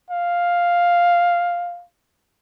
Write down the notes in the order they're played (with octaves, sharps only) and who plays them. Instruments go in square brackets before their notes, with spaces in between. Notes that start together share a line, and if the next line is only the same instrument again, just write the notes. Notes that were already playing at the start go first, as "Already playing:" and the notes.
[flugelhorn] F5